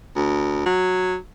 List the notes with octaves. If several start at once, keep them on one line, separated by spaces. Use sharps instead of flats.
D2
F#3